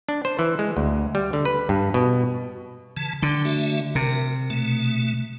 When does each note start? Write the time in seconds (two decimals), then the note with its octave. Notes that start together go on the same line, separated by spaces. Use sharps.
0.09 D4
0.25 C5
0.39 E3
0.59 G#3
0.77 D2
1.15 G3
1.33 D3
1.45 B4
1.69 G2
1.94 B2
2.97 C#3 E3 A5
3.22 D3 G5
3.45 A3 F#4 E5
3.95 C3 A#4
4.50 B2 A3